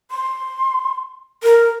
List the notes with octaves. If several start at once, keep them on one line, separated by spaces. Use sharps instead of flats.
C6
A#4